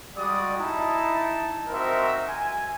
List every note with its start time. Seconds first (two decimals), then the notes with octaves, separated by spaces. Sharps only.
0.15 G3 G#3 F#4 D5 D#6
0.58 D#4 E4 A5
1.68 C4 D#4 F#4 A#4 C5 E5
2.28 G#5